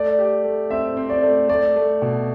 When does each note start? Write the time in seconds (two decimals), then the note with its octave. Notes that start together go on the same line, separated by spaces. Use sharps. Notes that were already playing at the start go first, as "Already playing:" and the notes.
Already playing: A3 D5
0.19 G4
0.44 A3
0.70 C4 E5
0.97 C4
1.10 D5
1.23 A3
1.49 A3 D5
1.76 A3
2.02 B2